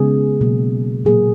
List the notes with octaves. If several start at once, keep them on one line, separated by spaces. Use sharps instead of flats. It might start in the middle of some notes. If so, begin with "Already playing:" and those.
Already playing: C#3 G#3 B3 G#4
B2 F#3 A#3
A#2 F#3 A#3 G#4